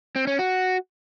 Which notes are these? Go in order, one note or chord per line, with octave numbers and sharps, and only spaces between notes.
C4
C#4
F#4